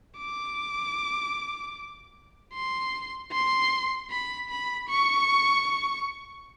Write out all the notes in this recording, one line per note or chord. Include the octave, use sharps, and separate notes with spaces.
D6
C6
C6
B5
B5
C#6